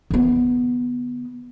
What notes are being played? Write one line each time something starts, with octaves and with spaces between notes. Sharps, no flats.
D3 B3